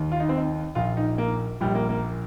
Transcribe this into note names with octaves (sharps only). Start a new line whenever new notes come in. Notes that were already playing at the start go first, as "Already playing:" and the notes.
Already playing: D#2 D#3
F4
D#4
C4
D#4
A#1 A#2 F4
D#4
A#3
A#1 A#2 G3
A#3
A#3